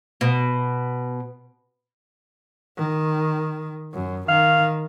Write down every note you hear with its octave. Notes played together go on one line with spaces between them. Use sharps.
B2
D#3
F#2
D#3 F5